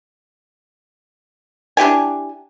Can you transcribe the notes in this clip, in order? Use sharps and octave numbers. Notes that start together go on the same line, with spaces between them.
D4 E4 G4 G#5